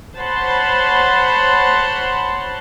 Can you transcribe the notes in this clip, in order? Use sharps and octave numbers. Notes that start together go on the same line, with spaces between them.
C5 C#5 F#5 A5 B5 C6